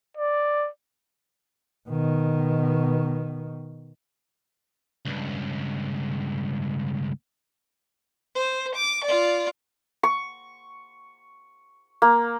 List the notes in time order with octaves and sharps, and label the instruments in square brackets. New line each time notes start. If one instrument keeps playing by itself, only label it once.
[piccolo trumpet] D5
[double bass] B2 D#3
[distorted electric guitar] C#2 G2
[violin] C5
D6
F4 D5
[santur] C#6
A#3